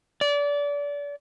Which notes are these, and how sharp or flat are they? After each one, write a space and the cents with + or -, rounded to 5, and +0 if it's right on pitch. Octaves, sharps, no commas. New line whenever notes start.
D5 -30